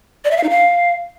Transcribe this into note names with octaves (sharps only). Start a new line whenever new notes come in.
D5
E5
F5
D#4
F5